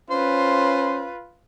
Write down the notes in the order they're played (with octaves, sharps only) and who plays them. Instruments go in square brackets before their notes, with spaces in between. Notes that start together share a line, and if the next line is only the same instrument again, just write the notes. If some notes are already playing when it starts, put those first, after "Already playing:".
[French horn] C#4 [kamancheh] F4 B4 [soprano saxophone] C5